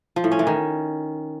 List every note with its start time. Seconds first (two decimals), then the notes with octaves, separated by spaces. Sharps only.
0.16 F3
0.24 A2
0.31 C#4
0.39 E3
0.47 D#3